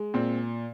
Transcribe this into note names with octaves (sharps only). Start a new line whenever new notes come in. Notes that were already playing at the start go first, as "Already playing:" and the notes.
Already playing: G#3
A#2 C4